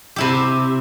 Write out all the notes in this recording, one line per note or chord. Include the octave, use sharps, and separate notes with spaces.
C3 E4 G4